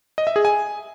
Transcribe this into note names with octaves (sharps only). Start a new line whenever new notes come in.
D#5
E5
G#4
G#5